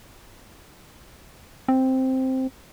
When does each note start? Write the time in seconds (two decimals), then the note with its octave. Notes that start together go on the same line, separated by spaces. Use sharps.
1.68 C4